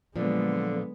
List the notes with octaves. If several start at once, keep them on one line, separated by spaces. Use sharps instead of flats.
A#2 D3 F3 F#3 G#3 B3 A4 D5